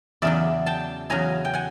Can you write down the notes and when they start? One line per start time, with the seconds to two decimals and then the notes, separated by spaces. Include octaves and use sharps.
0.22 E2 C#3 F#3 D5 E5
0.66 G5 A5
1.10 E2 C#3 F#3 G#5 A#5
1.45 G5
1.54 F#5 G#5